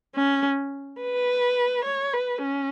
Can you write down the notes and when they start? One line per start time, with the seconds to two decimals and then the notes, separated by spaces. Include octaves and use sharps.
0.16 C#4
1.01 B4
1.85 C#5
2.13 B4
2.41 C#4